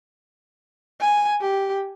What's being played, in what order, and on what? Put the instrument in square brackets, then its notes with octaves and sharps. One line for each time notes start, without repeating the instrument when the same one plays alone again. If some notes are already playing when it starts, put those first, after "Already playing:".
[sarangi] G#5
G4